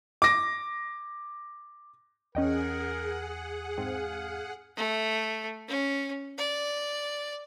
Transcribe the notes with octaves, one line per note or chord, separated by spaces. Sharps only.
D6 A#6
E2 C#4 G#4 A#4 D#5 F#5 G5
G#2 C4 F5
A3
C#4
D5